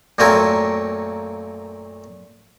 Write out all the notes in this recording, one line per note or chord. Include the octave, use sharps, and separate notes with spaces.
F#2 A#2 A3 C4 A#4 G#5